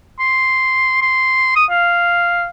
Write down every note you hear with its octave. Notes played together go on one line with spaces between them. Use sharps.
C6
C6
D#6
F5